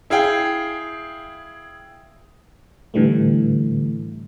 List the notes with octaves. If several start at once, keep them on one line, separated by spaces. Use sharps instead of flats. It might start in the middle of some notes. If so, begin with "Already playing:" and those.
E4 G#4 F5 G5
A2 D3 E3 G3 A3